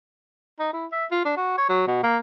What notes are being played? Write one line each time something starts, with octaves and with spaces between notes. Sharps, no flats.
D#4
E4
E5
F4
D4
F#4
C#5
F#3
B2
A#3